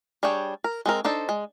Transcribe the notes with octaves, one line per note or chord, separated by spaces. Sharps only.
G3 D4 G#4 C#5 G5
A#4
G#3 C4 A#4
D4 D#4 A4 C5
G#3